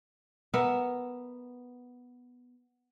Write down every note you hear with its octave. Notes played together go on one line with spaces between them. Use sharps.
B3 A#4 E5